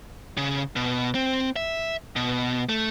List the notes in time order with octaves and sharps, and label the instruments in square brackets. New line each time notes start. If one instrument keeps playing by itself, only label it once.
[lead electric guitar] C#3
B2
C4
E5
B2
A3